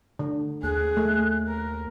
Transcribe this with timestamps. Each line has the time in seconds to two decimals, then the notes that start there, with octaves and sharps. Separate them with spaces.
0.19 D3
0.63 D#2 G#4 F#6
0.97 A3
1.48 A#4